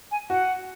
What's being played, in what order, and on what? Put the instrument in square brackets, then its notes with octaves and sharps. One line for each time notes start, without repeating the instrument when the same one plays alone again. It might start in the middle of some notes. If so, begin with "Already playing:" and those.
[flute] G#5
[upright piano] F#4 [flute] F#5